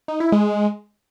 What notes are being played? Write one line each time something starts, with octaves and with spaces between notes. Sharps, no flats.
D#4
E4
G#3